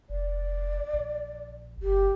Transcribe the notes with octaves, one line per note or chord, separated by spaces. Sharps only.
F1 D5
A#1
F#1 G4